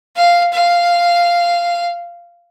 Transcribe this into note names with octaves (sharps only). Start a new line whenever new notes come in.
F5
F5